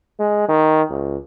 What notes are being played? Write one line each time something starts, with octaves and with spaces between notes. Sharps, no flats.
G#3
D#3
C#2